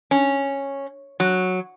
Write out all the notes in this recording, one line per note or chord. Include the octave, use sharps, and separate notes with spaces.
C#4
F#3